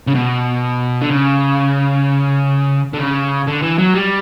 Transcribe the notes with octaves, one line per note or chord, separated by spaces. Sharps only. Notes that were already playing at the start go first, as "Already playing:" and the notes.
C#3
B2
D3
C#3
D3
C#3
D3
E3
F#3
G3